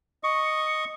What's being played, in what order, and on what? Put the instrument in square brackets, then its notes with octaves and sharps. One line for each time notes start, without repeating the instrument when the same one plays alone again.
[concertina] D#5 [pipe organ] C#6